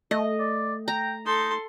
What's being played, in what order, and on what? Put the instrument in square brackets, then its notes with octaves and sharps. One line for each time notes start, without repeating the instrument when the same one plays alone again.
[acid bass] A3 [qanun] D#5
[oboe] D5
[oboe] G5 [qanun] A#5
[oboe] D#4 [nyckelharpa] A4 C6